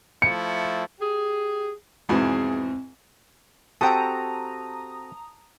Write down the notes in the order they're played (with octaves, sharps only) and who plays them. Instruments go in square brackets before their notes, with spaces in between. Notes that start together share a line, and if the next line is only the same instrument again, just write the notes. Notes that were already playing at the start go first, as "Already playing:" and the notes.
[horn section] F3 A3 E4 [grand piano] C#7
[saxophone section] G4 G#4
[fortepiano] E2 G#2 B2 [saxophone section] E3 F3 G#4 [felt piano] C4
[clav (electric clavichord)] C4 F#4 A4 [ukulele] G4 G5 [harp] A5 [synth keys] A#5 D#6